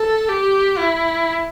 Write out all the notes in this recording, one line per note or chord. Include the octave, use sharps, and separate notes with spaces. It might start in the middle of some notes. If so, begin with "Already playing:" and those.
Already playing: A4
G4
E4